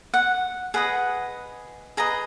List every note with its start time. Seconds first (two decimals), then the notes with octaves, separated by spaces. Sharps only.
0.14 F#5
0.74 G#4 B4 D#5 F#5
1.97 G#4 B4 D#5 A#5